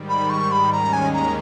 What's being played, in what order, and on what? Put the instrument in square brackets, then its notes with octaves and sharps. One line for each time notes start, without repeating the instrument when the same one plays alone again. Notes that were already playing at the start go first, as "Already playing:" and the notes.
Already playing: [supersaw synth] G#2 D#3 G3
[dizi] B5
C#6
B5
[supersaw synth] D#2 D#3 G#3 C#4 [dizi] A#5
[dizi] G#5
A#5